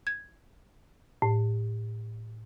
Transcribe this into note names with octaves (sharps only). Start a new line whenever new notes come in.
G#6
A2